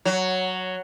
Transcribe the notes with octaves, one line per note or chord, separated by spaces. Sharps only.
F#3